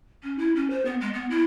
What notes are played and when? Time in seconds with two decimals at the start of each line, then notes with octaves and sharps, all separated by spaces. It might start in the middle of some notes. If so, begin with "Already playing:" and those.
0.23 C#4
0.38 E4
0.55 C#4
0.70 C5
0.85 B3
1.00 G#3
1.13 B3
1.30 E4